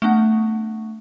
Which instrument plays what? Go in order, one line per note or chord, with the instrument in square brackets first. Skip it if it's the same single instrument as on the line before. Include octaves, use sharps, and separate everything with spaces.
[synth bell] A3 B3 D4 F#5